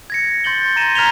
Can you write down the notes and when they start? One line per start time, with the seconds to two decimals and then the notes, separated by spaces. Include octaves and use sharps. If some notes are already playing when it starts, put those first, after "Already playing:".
0.10 G#6 A#6 C#7
0.44 C6 G6 A6 F#7 G7
0.76 A#5 C6 G#6 A#6 D#7 E7
0.95 A#5 F6 G#6 B6 F7 G7